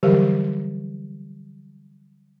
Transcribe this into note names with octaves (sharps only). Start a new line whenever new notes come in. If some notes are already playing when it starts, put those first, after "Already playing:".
D3 E3 F#3 G3 G4 A#4